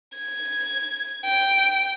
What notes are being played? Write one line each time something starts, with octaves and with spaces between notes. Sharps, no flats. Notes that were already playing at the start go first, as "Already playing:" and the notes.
G#6
G5